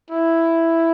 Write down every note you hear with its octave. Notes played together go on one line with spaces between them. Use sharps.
E4